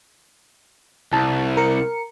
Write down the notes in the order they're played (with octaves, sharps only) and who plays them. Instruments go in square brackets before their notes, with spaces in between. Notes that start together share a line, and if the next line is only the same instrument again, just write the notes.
[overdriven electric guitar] C2 [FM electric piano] A5
[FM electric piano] A#4 C#7